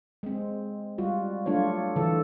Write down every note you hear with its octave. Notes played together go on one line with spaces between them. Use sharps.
G#3 C4
G3 F4 F#4
F#3 A3 D4 F4 C#5
D3 E3 A4